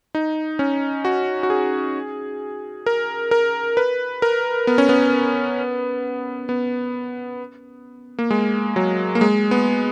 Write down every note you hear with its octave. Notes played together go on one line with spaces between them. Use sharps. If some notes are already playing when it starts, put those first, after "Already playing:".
D#4
C#4
F#4
F#4
G#4
A#4
A#4
B4
A#4
B3
C#4
B3
B3
A#3
G#3
F#3
A#3
G#3
B3